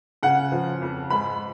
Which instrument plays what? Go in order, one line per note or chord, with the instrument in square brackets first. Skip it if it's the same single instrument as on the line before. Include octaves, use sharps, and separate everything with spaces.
[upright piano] C#3 F#5
F3
F2
G#2 B5